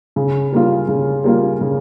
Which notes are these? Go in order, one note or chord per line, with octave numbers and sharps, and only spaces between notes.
C#3
G3 A#3 F4
C#3
G3 A#3 F4
C#3